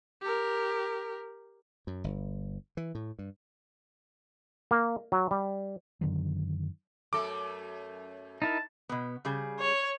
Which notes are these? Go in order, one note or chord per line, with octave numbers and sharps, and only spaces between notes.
G4 A#4
F#2
G1
E3
A2
G2
A#3
F#3
G3
F#2 D3 D#3 F#3
F#2 A3 A4 D6
D#4 E4 A#4 A5
B2 B3
C#3 G3 G#4
C#5